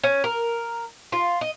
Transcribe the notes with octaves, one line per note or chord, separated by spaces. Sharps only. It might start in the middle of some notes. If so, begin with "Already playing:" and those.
C#4
A#4
F4
D#5